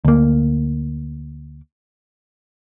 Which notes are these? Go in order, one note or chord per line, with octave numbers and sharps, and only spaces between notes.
D2 A#3